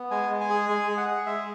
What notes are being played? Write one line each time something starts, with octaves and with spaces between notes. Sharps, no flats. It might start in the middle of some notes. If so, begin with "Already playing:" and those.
Already playing: B3
G#3 G#5
G#3
G#5
G#4
G#3 G#5
G#4
F#5
G#4
G#3 E5